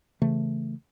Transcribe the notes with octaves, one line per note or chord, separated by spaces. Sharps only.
C#3 E3 A3